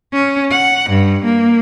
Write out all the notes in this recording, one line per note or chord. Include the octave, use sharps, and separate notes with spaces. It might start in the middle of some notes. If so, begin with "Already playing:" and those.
C#4
F#5
G2
A#3